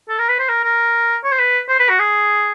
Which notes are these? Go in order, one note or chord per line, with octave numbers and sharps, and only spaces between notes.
A4
A#4
B4
C5
A#4
A#4
C#5
C5
B4
C5
B4
F#4
G#4